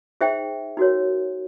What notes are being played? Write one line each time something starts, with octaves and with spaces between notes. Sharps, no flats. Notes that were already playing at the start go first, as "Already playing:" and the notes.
D#4 G#4 C5 E5 G5
D#4 F#4 A#4 C#5